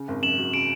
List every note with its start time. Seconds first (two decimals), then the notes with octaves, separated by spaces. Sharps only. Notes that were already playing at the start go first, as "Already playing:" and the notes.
Already playing: C#3
0.08 G#1
0.23 F#2 E7 F#7
0.39 F#3
0.53 C#3 D7 E7